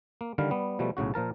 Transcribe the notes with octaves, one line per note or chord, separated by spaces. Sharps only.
A#3
D3 D#3 G3 F5
G3 B3
B2 F3 G3 A3
B1 A2 C#3 F#4
A#2 F3 A#4 A5